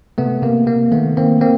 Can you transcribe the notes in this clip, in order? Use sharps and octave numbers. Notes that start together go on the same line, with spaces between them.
C3 A3 B3
C3 A#3
C3 A#3
D#3 A3 B3
D#3 A#3 C4
A#3 C4